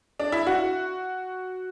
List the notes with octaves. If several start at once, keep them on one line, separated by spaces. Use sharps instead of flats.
D4
E4
F#4